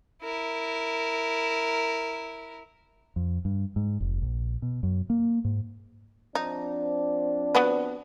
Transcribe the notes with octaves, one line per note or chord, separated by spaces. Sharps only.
E4 A#4
F2
G2
G#2
F1
A#1
B2
F#2
A#3
G#2
F3 C4 D4 D#4
B3 F#4 B4